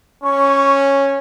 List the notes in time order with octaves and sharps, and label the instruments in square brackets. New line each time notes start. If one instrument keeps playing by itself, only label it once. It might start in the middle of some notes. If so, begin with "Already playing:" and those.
[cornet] C#4 [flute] C#6